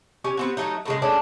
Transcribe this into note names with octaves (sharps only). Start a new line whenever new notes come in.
C#4 G4 G#5
B3 C4 F#4
F#3 A3 D#4
A2 C#3 G#3
G#3 A3 C#4 D4